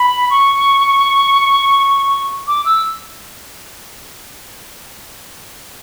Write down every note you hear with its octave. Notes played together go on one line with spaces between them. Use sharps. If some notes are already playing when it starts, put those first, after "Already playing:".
Already playing: B5
C#6
D6
E6